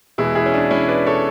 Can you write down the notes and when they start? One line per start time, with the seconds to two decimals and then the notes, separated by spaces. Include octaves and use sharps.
0.18 E2 B2 G#3 E4 G#4
0.35 E4 G#4
0.46 C#4
0.54 D4
0.71 C#4 E4
0.88 B4 D5
1.07 A4 C#5